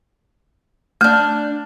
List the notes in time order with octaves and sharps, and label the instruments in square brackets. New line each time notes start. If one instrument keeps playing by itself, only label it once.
[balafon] A3 [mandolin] D4 G6